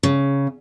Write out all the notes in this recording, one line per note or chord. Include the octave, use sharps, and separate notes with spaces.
C#3